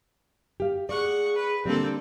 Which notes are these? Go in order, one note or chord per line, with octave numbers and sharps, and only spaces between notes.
G4 F5
G#4 D5 F#5 C#6
B4
D3 G3 A#3 C4 D4 A4